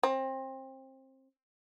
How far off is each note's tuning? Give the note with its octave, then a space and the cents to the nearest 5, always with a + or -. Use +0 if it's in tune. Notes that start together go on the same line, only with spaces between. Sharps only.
C4 +25